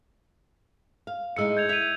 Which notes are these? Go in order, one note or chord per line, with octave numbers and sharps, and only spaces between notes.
F5
A2 G#3 D#4 E6 C#7
G6 G#6 F7
E5 D#7 F7